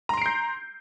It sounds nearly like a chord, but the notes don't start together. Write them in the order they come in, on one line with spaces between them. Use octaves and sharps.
A#5 C6 D7 C7 G6